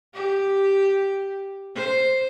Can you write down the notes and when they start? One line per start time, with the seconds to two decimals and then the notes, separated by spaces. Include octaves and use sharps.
0.14 G4
1.75 C5